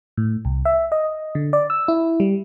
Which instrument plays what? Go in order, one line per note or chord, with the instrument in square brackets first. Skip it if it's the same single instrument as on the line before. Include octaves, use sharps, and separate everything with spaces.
[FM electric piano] A2
C2
E5
D#5
D3
D5
E6
E4
G3